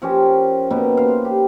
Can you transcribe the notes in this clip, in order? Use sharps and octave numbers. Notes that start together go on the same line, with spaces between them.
F3 C#4 G4 A#4
B2 A#3 B3 D#4
C5 F5
G4